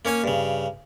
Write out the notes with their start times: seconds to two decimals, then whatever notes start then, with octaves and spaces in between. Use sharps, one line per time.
0.05 A#3 C#4 C#5 G#5
0.24 G2 C#3